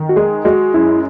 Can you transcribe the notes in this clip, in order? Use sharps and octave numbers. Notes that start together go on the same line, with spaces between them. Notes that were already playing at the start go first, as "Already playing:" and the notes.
Already playing: D#3
F#4
G#3 G#4
G#3 F#4
F#2 E4